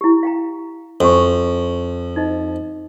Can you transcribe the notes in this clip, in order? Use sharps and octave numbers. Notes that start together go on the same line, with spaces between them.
E4 G4
F5 G5 A#5
F2 F#4 G#5 C#6
D#4 C5 D#5